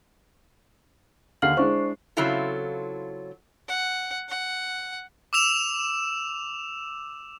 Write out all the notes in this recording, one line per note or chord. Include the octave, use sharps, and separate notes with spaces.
D#2 D3 F5 F6 C7 F#7
G#3 D4 E4 C5 C#6
C#3 F#3 C4 E4 F4 A4
F#5
F#5
D6 E6 E7 F7